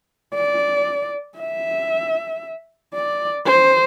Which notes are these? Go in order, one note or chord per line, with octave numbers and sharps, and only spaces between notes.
D5
E5
D5
C5